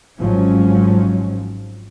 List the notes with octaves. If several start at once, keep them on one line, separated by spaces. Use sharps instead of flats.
G#1 G#2 F3 F#3 C#4